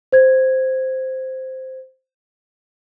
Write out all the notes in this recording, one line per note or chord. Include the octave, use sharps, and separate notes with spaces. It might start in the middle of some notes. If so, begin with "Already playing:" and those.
C5 G#6